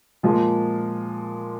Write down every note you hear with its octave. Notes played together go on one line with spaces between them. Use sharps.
A#2 F3 G#3